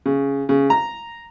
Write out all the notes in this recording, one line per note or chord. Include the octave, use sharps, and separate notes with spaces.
C#3
C#3
A#5